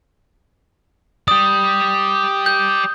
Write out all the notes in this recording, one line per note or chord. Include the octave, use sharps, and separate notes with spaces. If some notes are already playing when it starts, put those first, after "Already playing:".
G4 D5 D#6
G6